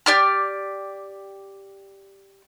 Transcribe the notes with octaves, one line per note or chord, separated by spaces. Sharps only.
G4 D5 F6